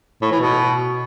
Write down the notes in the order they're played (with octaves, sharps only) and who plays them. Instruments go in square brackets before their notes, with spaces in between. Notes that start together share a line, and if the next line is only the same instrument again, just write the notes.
[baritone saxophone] A2
E3
B2